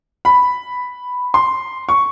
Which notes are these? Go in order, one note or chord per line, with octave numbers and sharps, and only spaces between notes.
B5
C6
C#6